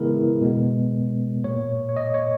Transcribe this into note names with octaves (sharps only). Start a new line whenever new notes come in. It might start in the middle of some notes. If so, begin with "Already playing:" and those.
Already playing: C#3 E3 G#3 B3 E4 G#4 A#4
B2 G#3 B3
A#2 A#3 C#5
C#5
D#5
C#5